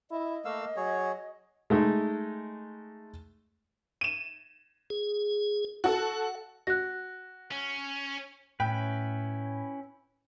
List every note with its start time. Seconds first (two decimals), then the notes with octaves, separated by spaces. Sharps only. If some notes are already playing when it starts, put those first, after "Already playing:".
0.11 E4 D#5
0.45 A3 A#3 F5 E6
0.76 F#3 G#4 C#5
1.70 G#3 A3 D#4
4.01 D#7 E7
4.90 G#4
5.84 F#4 A4 F#5
6.67 F#4 F#6 A#6
7.52 C#4
8.60 A2 C#4 E4 B4 G5